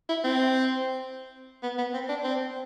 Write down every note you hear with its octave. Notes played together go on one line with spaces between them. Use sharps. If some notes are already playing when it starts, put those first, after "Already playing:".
E4
C4
B3
B3
C4
D4
C4